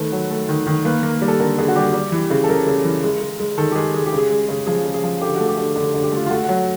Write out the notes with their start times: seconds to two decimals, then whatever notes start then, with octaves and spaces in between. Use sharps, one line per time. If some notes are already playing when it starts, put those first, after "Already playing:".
Already playing: D#3 A3 B4
0.12 F#3
0.31 A3
0.49 D#3
0.67 D#3
0.85 A#3 B4
1.03 A#3
1.22 G3
1.28 A4
1.40 D3 A#4
1.58 D3 G#4
1.68 F#4
1.76 G3 G4
1.94 G3
2.12 E3
2.30 C#3
2.44 A4
2.49 C#3 A#4
2.67 C#3
2.85 E3
3.03 G#3
3.21 G#3
3.40 G#3
3.58 D#3 A4
3.72 G4
3.76 G#3 G#4
3.94 G#3 G#4
4.06 G4
4.13 C#3
4.18 G#4
4.31 G#3
4.49 C#3
4.67 F3 G#4
4.85 C#3
4.94 G#4
5.03 F3
5.21 D3 G4
5.35 A3 F#4
5.48 G4
5.58 D3
5.75 D3 G4
5.94 D3
6.03 G4
6.12 A3 F4
6.26 F4
6.30 A3 F#4
6.44 F#3 F#4